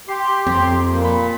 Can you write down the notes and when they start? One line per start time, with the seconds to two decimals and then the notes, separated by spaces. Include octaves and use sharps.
0.08 G4 C6
0.47 F2 C4
0.88 A#2
1.04 B5